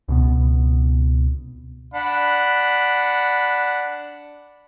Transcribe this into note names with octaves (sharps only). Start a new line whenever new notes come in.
C#2 B2 B3
D4 F#5 B5